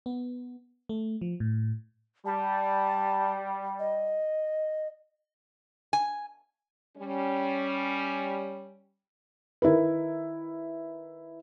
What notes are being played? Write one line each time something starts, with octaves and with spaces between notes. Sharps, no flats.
B3
A3
F3
A2
G3 A5
D#5
G#5
G3 C#4
D#3 E4 A#4 B4